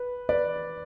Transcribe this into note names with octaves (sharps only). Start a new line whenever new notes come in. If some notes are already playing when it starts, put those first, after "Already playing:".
Already playing: B4
B4 D5